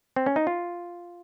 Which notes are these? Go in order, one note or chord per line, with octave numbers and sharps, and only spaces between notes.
C4
C#4
D#4
F4